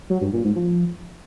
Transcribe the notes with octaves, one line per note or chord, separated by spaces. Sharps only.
F#3
G2
A#2
G#2
F3